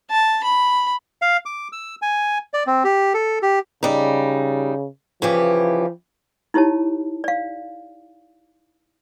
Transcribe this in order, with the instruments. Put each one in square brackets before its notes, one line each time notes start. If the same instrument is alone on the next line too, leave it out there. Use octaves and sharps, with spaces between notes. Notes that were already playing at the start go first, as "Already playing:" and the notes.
[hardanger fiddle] A5
B5
[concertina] F5
D6
E6
G#5
D5
C4
G4
A4
G4
[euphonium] C#3 [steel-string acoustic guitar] G3 D#4
[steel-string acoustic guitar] C#3 E3 G4 [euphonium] F3
[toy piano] D#4 E4 G4 C#5 A5
D5 F5